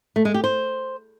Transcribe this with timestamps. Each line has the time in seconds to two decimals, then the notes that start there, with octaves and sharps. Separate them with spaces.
0.16 A3
0.25 G#3
0.34 G4
0.44 C5